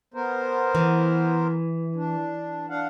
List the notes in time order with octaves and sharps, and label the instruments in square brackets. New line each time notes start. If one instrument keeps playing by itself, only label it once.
[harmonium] B3 A#4 C5
[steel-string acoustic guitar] E3
[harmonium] D4
D4 F5 F#5